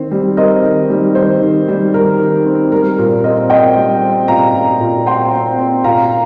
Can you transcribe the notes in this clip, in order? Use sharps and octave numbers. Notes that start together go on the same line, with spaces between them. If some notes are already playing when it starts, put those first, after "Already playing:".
Already playing: D#3 C4
G3
C4 A#4 D#5
D#3
G3
D#3 C5
D#3
G3
D#3 A#4
D#3
C4
G3 A#4
A#2 A#4
C4 A#4 D#5
C4 D#5 G5
G3
C4
A#2 F5 A#5
A#2
A#2
C4 G5 C6
C4
C4
A#2 F5 A#5